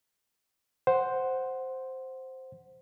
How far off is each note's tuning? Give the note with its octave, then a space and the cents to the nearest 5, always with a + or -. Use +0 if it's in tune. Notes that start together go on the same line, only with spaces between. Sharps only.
C5 +0 F#5 +0